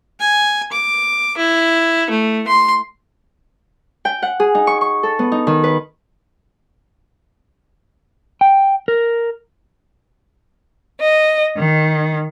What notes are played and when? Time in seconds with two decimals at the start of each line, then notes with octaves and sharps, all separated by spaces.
0.20 G#5
0.72 D6
1.37 E4
2.10 A3
2.48 C6
4.05 G5
4.23 F#5
4.40 G#4
4.55 D#4
4.67 C#6
4.81 C#6
5.03 A4
5.19 B3
5.32 D#4
5.47 D#3
5.64 B4
8.41 G5
8.88 A#4
11.01 D#5
11.56 D#3